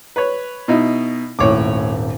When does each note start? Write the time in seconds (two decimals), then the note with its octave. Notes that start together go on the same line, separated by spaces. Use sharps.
0.16 B4 C#5
0.68 B2 D#4 E4
1.39 D#1 G#1 A2 C#5 D6